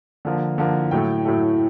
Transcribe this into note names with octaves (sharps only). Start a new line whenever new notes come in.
D3 F3 A#3
D3 F3 A#3
A2 F#3 A3 G5
A2 F#3 A3